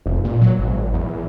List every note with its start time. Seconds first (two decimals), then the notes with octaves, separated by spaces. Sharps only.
0.06 F1
0.25 A#2
0.41 F#3
0.58 G#1
0.93 E2